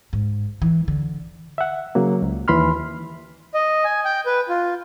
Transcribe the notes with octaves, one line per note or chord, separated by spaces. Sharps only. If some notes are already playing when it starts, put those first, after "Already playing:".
G#2
E3
D3
E5 F#5
C#3 F#3 A#3
C#2
D#2 E3 B5 C6 F6
D#5
G#5
G5
B4
F4